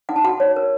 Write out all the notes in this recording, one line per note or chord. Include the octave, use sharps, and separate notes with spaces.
D#4 F#5
A5
F#4 F#5
C#5
A#4